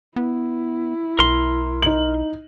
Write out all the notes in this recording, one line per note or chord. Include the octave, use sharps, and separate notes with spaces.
B3 E4
B1 A#4 C6
D#4 F#7